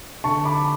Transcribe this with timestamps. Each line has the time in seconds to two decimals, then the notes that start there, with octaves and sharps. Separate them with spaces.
0.24 D3 A5 C#6
0.45 B5 D6